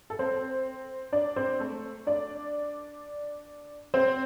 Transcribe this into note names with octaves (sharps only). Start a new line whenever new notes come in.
A4
C4 C5
D4 D5
C4 C5
A3 A4
D4 D5
C4 C5